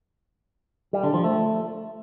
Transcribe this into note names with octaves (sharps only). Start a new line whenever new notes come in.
G3
D3
F3
A3